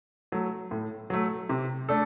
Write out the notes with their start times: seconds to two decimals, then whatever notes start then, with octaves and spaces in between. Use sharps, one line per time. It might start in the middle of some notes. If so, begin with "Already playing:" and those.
0.32 F#3 A3
0.71 A2
1.10 F#3 A3
1.49 C3
1.89 A3 D4 A4